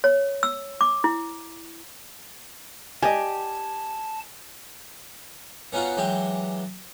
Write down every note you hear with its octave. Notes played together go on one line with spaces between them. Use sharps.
C#5
E6
D6
E4
G4 D5 D#5 G#5 A5
B3 C#4 D#4 F4 F#4
E3 F#3 G#3 G4